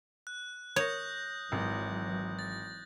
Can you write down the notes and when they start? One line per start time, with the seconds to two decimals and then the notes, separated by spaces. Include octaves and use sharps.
0.27 F#6
0.76 C#5 D#6 G6 A#6
1.52 G#1 E3 F#3
2.39 A6